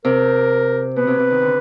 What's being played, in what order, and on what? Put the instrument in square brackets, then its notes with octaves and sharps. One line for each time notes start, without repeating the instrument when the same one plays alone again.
[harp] C3 [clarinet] A#4
[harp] B2 [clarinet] B4
[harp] C3
C3
D#3
D3